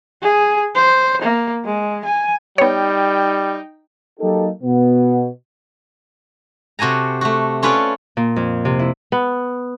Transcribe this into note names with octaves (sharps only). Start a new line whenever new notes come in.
G#4
C5
A#3
G#3
G#5
G3 B3 D#4 C#5 G5
F#3 A#3 D#4 G4 A4
B2 B3
C3 F#4 A4 G#5 A#5
A3 F#4
C#4 F4 A4 B4 C#5 D5
A#2
F2
C3
E4
B3